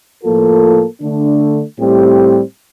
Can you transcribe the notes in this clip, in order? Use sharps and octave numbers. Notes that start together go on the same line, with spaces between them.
A2 F3 A#3 F4 A4
D3 A3 D4
A2 G3 C4 G4